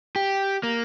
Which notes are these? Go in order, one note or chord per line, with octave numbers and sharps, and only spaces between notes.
G4
A#3